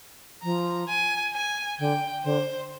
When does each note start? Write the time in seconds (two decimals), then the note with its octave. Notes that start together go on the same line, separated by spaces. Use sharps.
0.42 F3 A#5
0.88 G#5
1.34 G#5
1.79 D3 G5
2.24 D3 C5